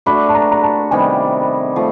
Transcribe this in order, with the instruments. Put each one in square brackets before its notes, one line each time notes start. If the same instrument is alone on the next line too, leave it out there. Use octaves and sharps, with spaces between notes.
[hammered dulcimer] A3 D4 F#4 [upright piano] B5
[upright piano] A5
A#5
A#5
A5
[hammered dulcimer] C3 D#3 G3 B3 [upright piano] G#5
[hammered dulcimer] F3 A3